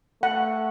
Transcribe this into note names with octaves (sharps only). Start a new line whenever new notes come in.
A3 F#5